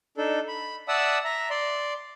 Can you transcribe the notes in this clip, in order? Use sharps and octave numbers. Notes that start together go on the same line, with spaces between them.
D4 D#4 A4
B5
D5 E5 F#5 A5 D#6 E6
E5 A#5
D5 C6